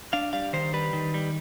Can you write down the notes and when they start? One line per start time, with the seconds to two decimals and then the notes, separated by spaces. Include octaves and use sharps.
0.13 D4 F5
0.33 G3 F5
0.53 D#3 C5
0.73 G3 B4
0.93 D#3
1.14 G3